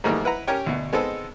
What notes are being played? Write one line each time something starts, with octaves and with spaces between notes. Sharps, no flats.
G#2 D#3 G3 A3 A#3
E4 B4 F#5 A#5
C#4 G4 A#4 C#5 G5
D2 B2
G#3 B3 C4 D#4 A4